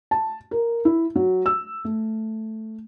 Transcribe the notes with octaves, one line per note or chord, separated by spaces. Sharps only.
A5
A#4
E4
F#3
E6
A3